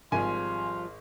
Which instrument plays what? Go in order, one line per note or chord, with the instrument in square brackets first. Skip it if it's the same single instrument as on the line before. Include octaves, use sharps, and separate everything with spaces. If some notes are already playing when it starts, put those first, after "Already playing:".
[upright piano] G#1 G#3 C6 [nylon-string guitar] F3 G3 [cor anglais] F4 [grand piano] G#5